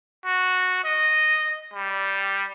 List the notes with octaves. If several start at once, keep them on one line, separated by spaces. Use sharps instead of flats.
F#4
D#5
G3